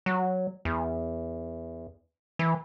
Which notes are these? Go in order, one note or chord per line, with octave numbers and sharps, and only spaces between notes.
F#3
E2
E3